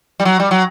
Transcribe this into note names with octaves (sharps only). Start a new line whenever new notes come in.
G3
F#3
G3
F#3